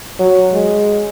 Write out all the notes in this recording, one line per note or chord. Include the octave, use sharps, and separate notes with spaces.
F#3
G#3